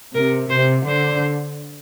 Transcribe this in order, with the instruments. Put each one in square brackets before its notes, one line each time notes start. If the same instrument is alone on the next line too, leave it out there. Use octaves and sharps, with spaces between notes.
[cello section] C3 [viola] A#4
[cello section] C3 [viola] C5
[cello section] D3 [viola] C5